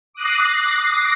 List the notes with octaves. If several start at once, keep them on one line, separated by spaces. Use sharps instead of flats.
D6 D#6 F#6 A#6 C7